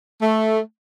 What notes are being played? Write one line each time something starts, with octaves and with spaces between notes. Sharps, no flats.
A3